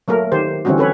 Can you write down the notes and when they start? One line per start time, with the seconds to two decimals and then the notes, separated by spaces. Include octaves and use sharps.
0.08 F#3 A3 A#3 A#4
0.32 D#3 G4 C5
0.65 D3 E3 G3 C4 C#4 F#4
0.78 C#4 A4 B4 C#5